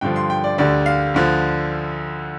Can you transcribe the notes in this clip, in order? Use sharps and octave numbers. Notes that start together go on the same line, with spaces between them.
G2 D3 F3 G5
C6
G5
D5
D2 D3 G3 D5
F5
D2 D3 F3